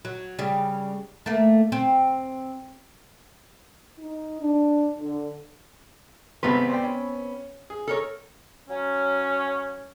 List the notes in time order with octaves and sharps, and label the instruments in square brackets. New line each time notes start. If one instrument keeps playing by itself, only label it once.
[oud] F#3
C#3 G3
A3 A#3
C4
[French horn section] D#4
D4
D3
[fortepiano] G#1 C3 C6 [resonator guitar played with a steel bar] B3 C4 B4
[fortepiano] C5 D5 G5
C#4
G#4
[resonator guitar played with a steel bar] A4 A#4 C#5
[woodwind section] F#3 C#4